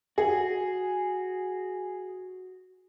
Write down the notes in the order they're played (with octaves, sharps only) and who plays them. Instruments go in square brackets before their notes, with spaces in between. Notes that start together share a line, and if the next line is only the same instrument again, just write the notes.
[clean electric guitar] F#4 [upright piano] G#4